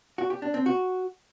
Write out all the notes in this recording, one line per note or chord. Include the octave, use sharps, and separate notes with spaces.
F#4
G4
D4
C4
F#4